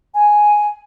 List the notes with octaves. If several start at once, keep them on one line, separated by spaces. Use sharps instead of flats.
G#5